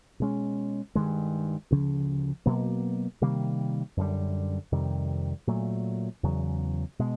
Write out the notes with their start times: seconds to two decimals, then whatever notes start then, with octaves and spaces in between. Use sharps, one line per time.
0.20 B2 G#3 C#4
0.95 G2 D#3 G#3
1.71 D2 C#3 F3
2.46 B2 F#3 A#3
3.21 C3 D#3 G3 A#3
3.97 F#2 D3 G3
4.72 F2 C3 D#3 G3
5.47 A#2 F#3 A3
6.23 E2 C#3 F#3
6.99 B2 G#3